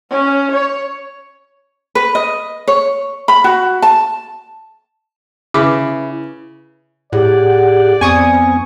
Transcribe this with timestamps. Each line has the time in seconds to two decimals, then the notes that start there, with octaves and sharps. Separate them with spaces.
0.10 C#4
0.52 C#5
1.95 B4
2.15 D#5
2.68 C#5
3.28 B5
3.44 F#4
3.82 A5
5.54 C#3 E4 B4 D6
7.13 A2 G4 G#4 D5 F#5
8.01 F2 B3 C4 G#5 C#6 D#6